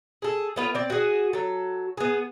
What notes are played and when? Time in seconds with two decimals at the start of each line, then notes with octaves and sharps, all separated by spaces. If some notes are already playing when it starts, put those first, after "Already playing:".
0.22 G#4 A4
0.56 A3 B3 F4
0.75 C4 D5
0.90 F#4 G#4
1.33 F#3 A4
1.97 B3 G#4